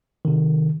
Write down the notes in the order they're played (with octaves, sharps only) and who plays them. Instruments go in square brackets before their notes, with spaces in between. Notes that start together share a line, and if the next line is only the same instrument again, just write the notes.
[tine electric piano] C3 D#3